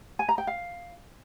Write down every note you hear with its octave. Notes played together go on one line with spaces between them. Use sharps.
G#5
A#5
G5
F5